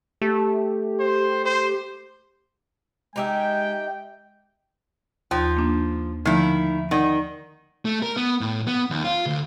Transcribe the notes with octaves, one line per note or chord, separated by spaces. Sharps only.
A3 G4
C5
C5
G#3 D#4 G4 E5 G5
D#2 F3
A#3 D4
D3 D#3 F3 A3 E4
D#3 D5 F#5
A3
A#4
B3
A2
B3
D#2
F4
D2